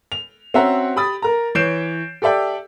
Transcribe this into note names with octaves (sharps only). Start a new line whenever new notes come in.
F7
C4 C#4 F#4 E5 F#5 A#5
G4 B5 D#6 A6
A#4 A#5
E3 C#5 G6 C7 D7 E7
G4 A4 D5 E5 G5